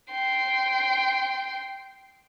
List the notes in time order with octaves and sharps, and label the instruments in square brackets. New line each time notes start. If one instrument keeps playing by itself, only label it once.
[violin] G5 C6